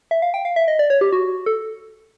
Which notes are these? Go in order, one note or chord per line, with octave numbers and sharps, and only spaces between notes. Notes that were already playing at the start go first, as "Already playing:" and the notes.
E5
F5
G5
F5
E5
D#5
D5
C#5
G4
F#4
A4